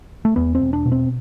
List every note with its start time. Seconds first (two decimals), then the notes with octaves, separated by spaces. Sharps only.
0.25 A3
0.36 E2 B3
0.55 C4
0.61 E1
0.73 D4
0.86 B2
0.92 C4